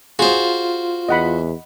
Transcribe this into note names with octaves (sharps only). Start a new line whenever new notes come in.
F4 F#4 G#4 C5
E2 D#5 F#5 B5